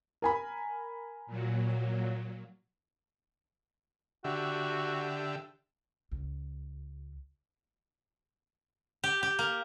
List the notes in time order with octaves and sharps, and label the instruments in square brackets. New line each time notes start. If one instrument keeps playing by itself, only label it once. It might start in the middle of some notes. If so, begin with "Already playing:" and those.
[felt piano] A#4 G#5 B5
[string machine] A#2 F#3
[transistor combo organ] D3 G4 E5 [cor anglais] F#4
[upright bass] C#2
[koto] G4
G4
A#3